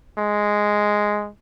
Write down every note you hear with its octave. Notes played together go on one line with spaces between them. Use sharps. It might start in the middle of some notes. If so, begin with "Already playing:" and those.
G#3